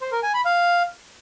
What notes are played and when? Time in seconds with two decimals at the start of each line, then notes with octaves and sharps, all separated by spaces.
0.01 C5
0.12 A#4
0.23 G#5
0.34 B5
0.45 F5